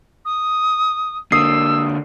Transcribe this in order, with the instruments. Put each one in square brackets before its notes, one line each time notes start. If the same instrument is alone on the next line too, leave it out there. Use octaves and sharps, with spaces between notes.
[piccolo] D#6
[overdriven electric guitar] D3 A#3 [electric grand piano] D#6 C7 [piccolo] E6